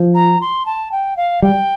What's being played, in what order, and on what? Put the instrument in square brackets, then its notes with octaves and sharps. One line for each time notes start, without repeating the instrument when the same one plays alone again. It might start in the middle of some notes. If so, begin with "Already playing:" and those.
Already playing: [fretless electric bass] F3
[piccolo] A#5
C6
A5
G5
F5
[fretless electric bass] G3 [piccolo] G5